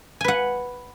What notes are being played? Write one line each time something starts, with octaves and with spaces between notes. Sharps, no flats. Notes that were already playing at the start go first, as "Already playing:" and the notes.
B4 F#5 G#5